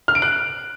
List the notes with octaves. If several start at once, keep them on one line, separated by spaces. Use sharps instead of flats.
F6
D7
F#6